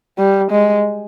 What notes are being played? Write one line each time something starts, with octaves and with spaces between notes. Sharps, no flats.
G3
G#3